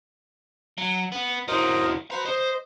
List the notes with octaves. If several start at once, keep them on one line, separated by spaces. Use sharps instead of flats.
F#3
B3
E3 F#3 A#4 C5 D#5
F#4 B4 C5 A#5
C5 D#5